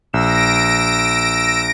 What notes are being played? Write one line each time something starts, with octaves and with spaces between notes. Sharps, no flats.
A#1 E6 A#6 D7